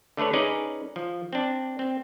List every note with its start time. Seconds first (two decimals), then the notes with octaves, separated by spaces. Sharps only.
0.17 D3 A3 D4 B4 C#5
0.33 C#4 D#4 G#4 B4 D5
0.96 F3
1.33 C4 D4
1.79 C4